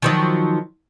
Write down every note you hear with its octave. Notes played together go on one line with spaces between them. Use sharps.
D#3 F3 F#3